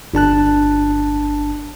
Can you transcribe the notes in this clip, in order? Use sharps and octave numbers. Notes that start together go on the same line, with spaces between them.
G1 D4 A5 F#6